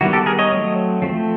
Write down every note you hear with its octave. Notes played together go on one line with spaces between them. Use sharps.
D#3 G3 B3 E4 F#4
G4 A4
G#4 A#4
C#5 D#5
F#3 A3 C4
F3 A3 C4